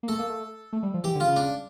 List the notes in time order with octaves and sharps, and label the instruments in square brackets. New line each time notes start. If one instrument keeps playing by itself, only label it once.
[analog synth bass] A#3
[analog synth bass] A3 [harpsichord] A4
[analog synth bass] A#3
A3
A3
G3
F3
[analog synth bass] E3 [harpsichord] G4
[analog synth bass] D3
[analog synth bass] C#3 [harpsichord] F4
[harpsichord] D4